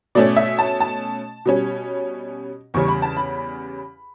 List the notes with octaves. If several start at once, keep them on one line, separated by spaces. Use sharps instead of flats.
B2 A3 C#4 D5
E5
A5
A5
B2 G3 C#4
E2 C#3 G3 C#4 C#6
B5
A5
B5